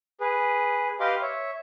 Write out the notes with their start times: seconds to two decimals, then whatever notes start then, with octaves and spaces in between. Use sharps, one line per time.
0.21 G#4 B4
1.00 G4 B4 D#5 F5 C6 D6
1.22 C#5 E5